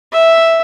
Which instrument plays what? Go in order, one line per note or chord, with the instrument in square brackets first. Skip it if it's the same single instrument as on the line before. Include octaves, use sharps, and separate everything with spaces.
[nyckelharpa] E5